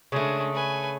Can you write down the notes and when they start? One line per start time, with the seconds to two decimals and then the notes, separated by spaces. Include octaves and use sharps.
0.12 C#3 G#3 A3 D4
0.54 B4 G#5